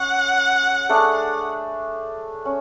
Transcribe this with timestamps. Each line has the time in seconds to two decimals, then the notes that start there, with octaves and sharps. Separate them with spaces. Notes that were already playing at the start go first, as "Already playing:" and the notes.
Already playing: C#4 G#4 F#5
0.89 A3 D4 G#4 D5
2.45 C#4